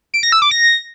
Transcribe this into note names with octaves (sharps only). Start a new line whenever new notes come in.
D7
A#6
E6
D6
A#6